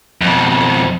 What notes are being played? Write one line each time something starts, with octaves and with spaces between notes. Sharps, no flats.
F2 B2